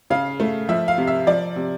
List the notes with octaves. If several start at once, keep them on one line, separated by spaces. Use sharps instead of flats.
C#3 F5
A3
F3 E5
F5
C3
E5
F3 D5
C3